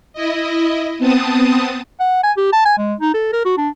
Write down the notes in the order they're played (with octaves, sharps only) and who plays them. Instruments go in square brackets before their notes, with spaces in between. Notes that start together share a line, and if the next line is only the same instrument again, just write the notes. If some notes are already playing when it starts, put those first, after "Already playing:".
[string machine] E4 D#5
B3 C4 A5 D#6
[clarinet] F#5
G#5
G4
A5
G#5
G#3
D#4
A4
A#4
F#4
D4